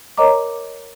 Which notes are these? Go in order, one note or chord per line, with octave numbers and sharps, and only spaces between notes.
A#4 C#5 D#5 A#5 D6